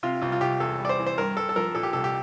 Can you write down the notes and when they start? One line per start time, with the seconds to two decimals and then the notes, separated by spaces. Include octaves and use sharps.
0.03 C3 F4
0.22 C2 F4
0.32 F4
0.41 C2 G4
0.60 E2 A4
0.79 G3
0.85 D5
0.89 C5
0.99 E3
1.07 C5
1.18 G2 A#4
1.37 G2 A4
1.49 A4
1.56 F3 A#4
1.75 A#2 A4
1.83 G4
1.93 C2 A4
2.04 G4